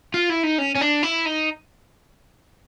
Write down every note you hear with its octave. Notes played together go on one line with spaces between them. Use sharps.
F4
E4
D#4
C#4
C#4
D4
E4
D#4